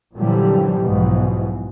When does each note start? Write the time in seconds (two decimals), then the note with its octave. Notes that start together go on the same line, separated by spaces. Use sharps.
0.14 F#2 A#2 D3 E3 F3 G3
0.81 B1 G#2 B2 E3 F3